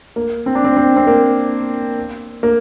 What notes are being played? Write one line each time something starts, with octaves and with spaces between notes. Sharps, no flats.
A#3
C4
D4
C4
C4
C4
A#3
A#3